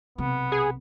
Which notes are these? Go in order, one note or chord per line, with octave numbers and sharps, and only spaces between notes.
B1 C3 B3
G#4